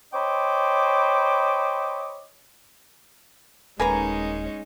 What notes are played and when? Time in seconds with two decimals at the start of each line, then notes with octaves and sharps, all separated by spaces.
0.14 C5 C#5 D#5 G5 B5 D6
3.80 D#1 G#3 A#3 C#4 D#4 B4 G#5 A#5